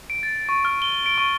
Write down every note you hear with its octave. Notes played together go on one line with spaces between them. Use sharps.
D7
A6
C#6
F6
G7
D7
C#6